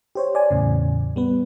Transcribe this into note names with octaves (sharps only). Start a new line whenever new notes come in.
G4 C5 C#5
D5 G#5
E2 A2 C#3
G3 B3 B4